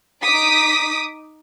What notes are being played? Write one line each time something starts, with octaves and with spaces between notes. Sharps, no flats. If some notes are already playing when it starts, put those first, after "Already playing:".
D#4 D6 D#6 B6